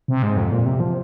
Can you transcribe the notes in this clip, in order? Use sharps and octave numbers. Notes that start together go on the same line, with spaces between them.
C3
G#2
F2
A#2
C3
F3